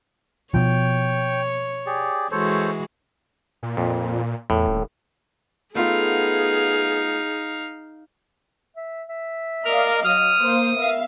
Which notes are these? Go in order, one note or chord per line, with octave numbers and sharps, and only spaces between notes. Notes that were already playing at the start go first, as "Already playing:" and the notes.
B2 F3 C#5 G5
G4 G#4 D5
E3 G#3 F#4 A4 C5 C#5
A#2
F2 A#2
E2 A2
D#1
A3 B3 D#4 F4 G#4 F5
E5
E5
A#4 D5 D#5 F5 F6
F#3 D#6 F6
A#3 C5 F5
B3 A#4 E5 F5